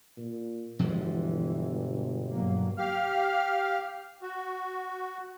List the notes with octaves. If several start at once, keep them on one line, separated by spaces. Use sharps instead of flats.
A#2
G1 B2 E3 F3 G#3
G2 F#3 A#3
G4 F5 F6
F#4